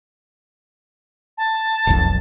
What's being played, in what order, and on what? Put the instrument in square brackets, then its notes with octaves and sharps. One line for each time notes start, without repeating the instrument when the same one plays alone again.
[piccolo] A5
[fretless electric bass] E1 B1 F2